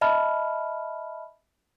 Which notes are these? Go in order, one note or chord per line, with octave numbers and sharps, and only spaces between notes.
D#5 E5 A5 B5 F6